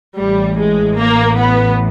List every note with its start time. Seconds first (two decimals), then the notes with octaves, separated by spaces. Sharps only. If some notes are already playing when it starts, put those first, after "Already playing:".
0.18 A1 A2 E3 G3
0.58 G#3
0.98 A#3
1.37 B3